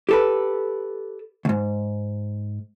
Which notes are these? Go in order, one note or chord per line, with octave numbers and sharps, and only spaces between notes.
G4 A4 B4
D2 G#2